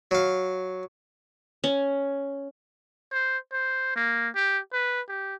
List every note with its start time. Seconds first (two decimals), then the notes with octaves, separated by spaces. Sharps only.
0.11 F#3 F5
1.64 C#4
3.12 C5
3.53 C5
3.96 A#3
4.35 G4
4.73 B4
5.09 G4